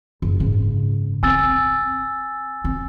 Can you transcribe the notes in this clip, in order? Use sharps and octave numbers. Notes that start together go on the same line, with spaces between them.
F#1
G#2 C#3
C4 G#5 E6 A6
C4